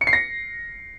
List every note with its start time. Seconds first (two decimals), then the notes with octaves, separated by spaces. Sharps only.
0.01 C#7
0.07 C7
0.13 A#6